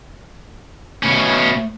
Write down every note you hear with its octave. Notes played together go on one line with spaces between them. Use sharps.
B2 A3 C#4